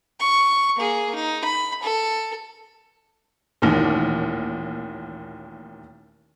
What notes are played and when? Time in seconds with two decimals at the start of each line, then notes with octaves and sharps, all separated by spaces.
0.20 C#6
0.77 A#3 G#4
1.15 D#4
1.44 B5
1.83 A4
3.62 A1 D#2 A#2